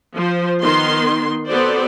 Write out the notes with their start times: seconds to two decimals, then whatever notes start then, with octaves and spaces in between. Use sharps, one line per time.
0.15 F3 C5
0.62 D#3 B3 C6
1.49 B3 C4 F#4 A4 C5 D5